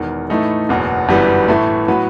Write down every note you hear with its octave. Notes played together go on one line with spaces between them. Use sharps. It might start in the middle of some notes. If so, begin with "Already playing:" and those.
Already playing: E1 E2 D#3
A2 E3 A3 D#4 A4
F#1 E2 B2 F#3
G1 F#2 E3 G3 B3
A2 E3 A3
A2 F#3 B3 F#4 B4